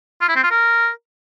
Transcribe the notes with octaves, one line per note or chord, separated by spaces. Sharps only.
F4
E4
C4
F4
A#4